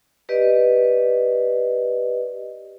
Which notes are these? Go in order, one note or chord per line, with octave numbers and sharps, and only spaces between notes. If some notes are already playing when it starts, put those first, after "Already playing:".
G4 B4 D5 D#5